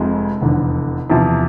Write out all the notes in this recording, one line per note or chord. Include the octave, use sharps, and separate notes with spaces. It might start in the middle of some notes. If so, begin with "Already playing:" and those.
Already playing: F1 F2 C3 F3 G#3
F1 E2 D3
E2 C3 F3